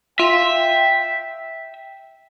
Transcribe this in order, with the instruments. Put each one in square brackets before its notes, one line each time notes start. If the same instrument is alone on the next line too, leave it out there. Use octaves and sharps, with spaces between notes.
[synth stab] F4 [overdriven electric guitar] E5 [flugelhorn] G5